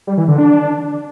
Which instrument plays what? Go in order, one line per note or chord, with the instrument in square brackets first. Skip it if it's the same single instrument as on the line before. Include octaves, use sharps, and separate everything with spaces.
[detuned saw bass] G3
E3
D3
D4